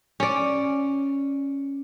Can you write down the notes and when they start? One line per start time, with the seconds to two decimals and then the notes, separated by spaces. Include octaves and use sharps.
0.20 C#4 D5